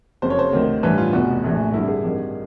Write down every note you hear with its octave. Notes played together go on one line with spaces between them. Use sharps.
F#1 F2 C#3 C5
C#5
C5
D2 C3 D#3
A1 G2 E3 B4
F4
F1 E2 B2 F#4
A#1 A2 E3
G#1 G2 D3 E4
G#4
G#1 G2 D#3